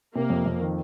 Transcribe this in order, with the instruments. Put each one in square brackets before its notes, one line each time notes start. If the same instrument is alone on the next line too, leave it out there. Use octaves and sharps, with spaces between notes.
[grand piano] C3 [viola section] A#3
[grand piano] F2
F2
D#3